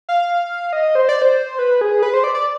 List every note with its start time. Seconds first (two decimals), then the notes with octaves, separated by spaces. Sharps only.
0.09 F5
0.73 D#5
0.95 C5
1.09 D5
1.22 C5
1.59 B4
1.81 G#4
2.03 B4
2.14 C5
2.24 D5
2.34 D5